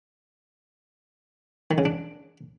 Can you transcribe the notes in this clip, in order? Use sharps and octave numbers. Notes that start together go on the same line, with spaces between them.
D#3
C#3
D4